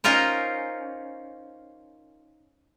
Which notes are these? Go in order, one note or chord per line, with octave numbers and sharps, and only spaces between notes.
C#4 D#4 F4 A#4 C5